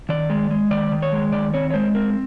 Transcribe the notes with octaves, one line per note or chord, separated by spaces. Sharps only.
D#3 D5
G#3
G#3
D#3 D5
D#3
C#5
G#3
D#3 D5
C4 C#5
C#5
G#3 C5
C4 A#4